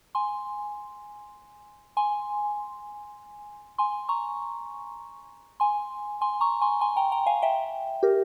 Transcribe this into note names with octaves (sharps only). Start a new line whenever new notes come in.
G#5 C6
G#5 C6
G#5 C6
A#5 C#6
G#5 C6
G#5 C6
A#5 C#6
G#5 C6
G#5 C6
G5 A#5
G5 A#5
F5 G#5
E5 G5
G4 A#4